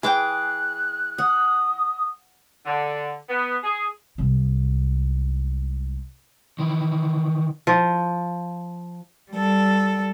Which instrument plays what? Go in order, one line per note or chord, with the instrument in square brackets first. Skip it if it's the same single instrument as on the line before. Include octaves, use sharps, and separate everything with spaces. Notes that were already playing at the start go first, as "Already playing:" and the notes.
[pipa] E3 G5 [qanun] G#4 D6 [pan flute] F#6
[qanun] F#5 [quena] D#6
[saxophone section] D3
B3
G#4
[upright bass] C2 G#2
[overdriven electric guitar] D#3 E3
[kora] F3
[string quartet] G3 A4